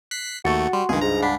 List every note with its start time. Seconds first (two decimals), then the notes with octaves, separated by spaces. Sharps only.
0.11 F#6 B6 C7
0.45 D#2 A3 F#4 C#6 A6 C#7
0.73 G3 C6
0.89 C#2 G2 D#3 G#4
1.01 G#2 A#5
1.22 D4 F#5 B5 B6